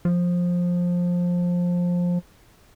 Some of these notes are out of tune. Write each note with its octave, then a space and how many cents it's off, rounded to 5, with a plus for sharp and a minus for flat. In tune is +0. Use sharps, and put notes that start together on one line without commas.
F3 +15